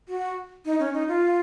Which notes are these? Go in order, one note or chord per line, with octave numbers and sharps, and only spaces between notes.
F#4
D#4
C#4
D#4
F4